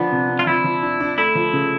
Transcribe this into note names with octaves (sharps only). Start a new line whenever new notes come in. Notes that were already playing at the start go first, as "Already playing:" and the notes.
Already playing: F3 B3 D4
C3
C3
F4
F3 E4
F3
D4
D4
A3 E4
F3
C#3